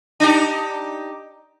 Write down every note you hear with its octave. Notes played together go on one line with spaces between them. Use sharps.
D4 D#4 G4